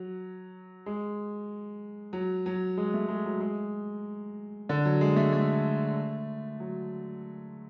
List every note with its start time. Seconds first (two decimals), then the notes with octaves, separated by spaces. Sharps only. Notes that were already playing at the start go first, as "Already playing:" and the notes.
Already playing: F#3
0.86 G#3
2.13 F#3
2.46 F#3
2.77 G#3
2.94 A3
3.09 G#3
3.26 F#3
3.41 G#3
4.69 D3
4.85 F#3
5.01 G#3
5.17 A3
5.33 A3
6.60 F#3